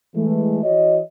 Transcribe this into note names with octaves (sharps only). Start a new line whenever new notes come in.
E3 G#3 A3
E3 F#4 C#5 D#5